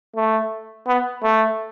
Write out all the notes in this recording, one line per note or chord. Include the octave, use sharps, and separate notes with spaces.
A3
B3
A3